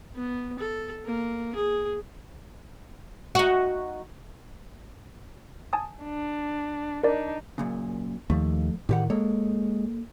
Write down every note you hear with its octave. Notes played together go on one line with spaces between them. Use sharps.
B3
A4
A#3
G#4
D#4 F#4
G#5 A5 D#6
D4
D4 D#4 A#4 D5
F#2 A#2 C#3
D#2 F3 A3
E2 A2 D#3 G4 F#5
G#3 A#3 A4 C#5